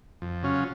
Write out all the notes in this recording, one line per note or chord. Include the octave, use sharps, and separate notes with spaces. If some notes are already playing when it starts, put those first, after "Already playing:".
F2
C#3 F#3 C#4 F4